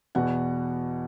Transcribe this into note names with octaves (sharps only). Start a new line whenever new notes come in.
E2 B2 F#4 F#5